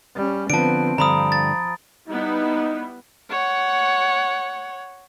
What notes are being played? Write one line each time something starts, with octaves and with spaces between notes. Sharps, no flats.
G3 C#4
D3 F3 B3 C4 A5 D7
G2 D3 F3 A#5 B5 D#6
A6
G3 B3 D#4 E4
C#5 F#5